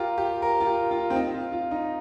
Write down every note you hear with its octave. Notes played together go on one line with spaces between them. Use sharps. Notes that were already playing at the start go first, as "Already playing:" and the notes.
Already playing: F4 G4 A#4
G4
A#4
F4
G4
F4
C4
D#4
F4
F4
D#4